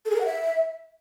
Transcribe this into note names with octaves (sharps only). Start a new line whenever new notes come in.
A4
G#4
A#4
F#5
E5